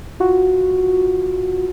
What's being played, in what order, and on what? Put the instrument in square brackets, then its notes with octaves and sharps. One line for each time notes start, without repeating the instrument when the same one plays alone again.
[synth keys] F4 F#4